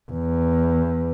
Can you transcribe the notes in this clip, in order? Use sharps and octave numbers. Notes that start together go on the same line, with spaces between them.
E2